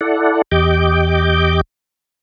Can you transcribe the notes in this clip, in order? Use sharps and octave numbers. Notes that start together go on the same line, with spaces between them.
E4 A4 D5 F#5
E2 G4 D#5 D6 G6